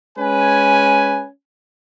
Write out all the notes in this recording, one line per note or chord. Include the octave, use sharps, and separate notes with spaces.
G#3 C#4 B4 G#5